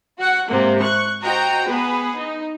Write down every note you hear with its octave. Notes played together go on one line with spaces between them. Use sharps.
F#4 F#5
G#2 C3 A#3
C#6 F#6
F#4 C5 D#5 G5 A#5
B3 G#4 B4
D#4